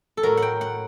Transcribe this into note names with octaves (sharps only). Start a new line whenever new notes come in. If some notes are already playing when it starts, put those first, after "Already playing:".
A4
A2 F#3 A#4
F#5 G5
F#5